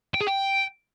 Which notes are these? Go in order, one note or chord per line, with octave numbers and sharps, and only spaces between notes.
G5
G#4
G5